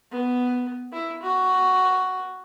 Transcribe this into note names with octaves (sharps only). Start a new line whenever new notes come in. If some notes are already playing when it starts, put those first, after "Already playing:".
B3
E4
F#4